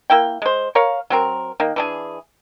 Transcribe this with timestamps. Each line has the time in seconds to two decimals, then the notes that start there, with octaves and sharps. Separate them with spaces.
0.10 A#3 E4 G5
0.42 G#3 C5
0.75 A#4 C#5 F5
1.10 F#3 C4 A#4
1.60 D#3 A#3
1.76 E3 D4 G#4